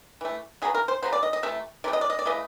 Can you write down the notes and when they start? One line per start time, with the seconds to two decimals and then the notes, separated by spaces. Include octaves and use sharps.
0.21 E3 A3
0.62 C#3 F#3 B3 G#4
0.75 A#4
0.88 C5
1.02 C#3 F#3 B3 C5
1.13 D5
1.23 D#5
1.33 D#5
1.43 C3 E3 A3 E5
1.84 C3 E3 A3 D5
1.93 D#5
2.01 D5
2.10 D#5
2.19 D5
2.25 C#3 E3 A3 D#5